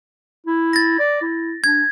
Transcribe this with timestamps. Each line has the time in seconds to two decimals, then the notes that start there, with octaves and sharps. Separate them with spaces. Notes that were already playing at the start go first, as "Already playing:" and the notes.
0.46 E4
0.73 A6 A#6
0.99 D5
1.22 E4
1.64 D4 G#6